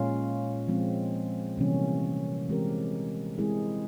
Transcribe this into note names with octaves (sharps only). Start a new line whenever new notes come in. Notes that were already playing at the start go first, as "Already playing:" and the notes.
Already playing: A#2 G#3 C#4 F4
F3 G#3 C4
C3 E3 G3 A#3 C#4
E3 G#3 C4 G4 A#4
G#3 C4 E4 G#4